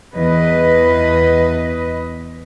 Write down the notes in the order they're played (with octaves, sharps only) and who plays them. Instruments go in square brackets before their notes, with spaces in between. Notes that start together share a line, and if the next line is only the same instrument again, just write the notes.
[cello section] E2 B4 D#5